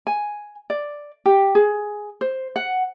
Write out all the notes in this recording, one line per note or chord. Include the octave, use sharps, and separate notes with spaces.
G#5
D5
G4
G#4
C5
F#5